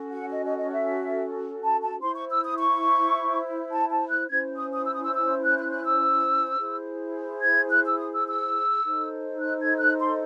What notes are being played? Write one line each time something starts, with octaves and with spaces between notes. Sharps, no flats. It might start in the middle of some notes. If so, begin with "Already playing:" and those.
Already playing: C#4 F#4 A4
F#5
D#5
D#5
D#5
E5
A5
A5
E4 C5 C6
C#6
E6
D#6
C#6
A5
A5
F#6
C#4 E4 C5 G#6
D#6
D#6
E6
D#6
E6
E6
F#6
F#6
F#6
E6
E4 G#4 C5
G#6
F#6
E6
D#6
E6
E6
D#4 A4 C5
F#6
G#6
F#6
C6